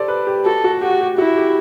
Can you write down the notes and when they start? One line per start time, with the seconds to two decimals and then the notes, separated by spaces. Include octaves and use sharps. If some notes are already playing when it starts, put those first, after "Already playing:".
Already playing: G4 A4 C5 D5
0.08 B4
0.27 G4
0.45 F#4 A4
0.64 F#4
0.81 F#4 G4
1.01 G4
1.18 E4 F#4
1.37 G4